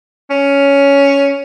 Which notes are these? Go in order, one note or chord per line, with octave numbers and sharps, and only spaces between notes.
C#4